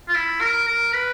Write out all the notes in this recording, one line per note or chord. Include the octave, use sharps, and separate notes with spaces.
F4
E4
A#4
A#4
B4